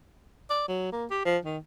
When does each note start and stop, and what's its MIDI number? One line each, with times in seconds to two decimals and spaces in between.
0.50 0.63 74
0.68 0.92 54
0.92 1.05 58
1.10 1.21 67
1.25 1.38 53
1.45 1.58 51